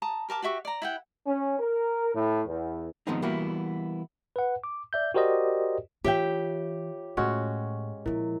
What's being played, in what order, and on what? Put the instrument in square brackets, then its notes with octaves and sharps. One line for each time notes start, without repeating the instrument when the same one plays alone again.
[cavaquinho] A5 A#5 D#6
G4 A#4 A5 D6
F#4 G4 E5 C#6
D5 A#5
E4 F#5 G5
[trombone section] C#4
A#4
A2
E2
[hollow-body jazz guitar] D#3 F3 G#3 B3 C4 D#4
E3 G3 A#3 B3 E4 F#4
[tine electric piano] B4 F#5
D6
D5 E5 G6
F#4 G4 A#4 C5 D5 D#5
[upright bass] E3 [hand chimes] F4 C#5 [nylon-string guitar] G4 E5 G5
[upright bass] A2 [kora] G#3 C#4 F#4
[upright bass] A#2 F3 [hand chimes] E4 A#4